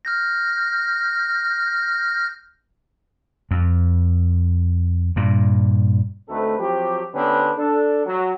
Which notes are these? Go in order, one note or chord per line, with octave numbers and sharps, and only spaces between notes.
F6 G6 A#6
F2
G2 A#2
D2 A3 C4 D#4 A4 B4
F3 F#3 C4 G4
D3 B3 C#4 G4 B4 C5
D4 A4
F#3